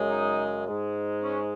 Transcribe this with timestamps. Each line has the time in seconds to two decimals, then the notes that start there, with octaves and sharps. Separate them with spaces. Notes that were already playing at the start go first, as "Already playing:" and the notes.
Already playing: F#2 C#3 G#3
0.08 D#4
0.66 G#2 G#3
1.21 C#4